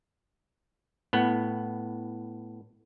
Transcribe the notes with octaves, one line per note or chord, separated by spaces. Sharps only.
A2 B3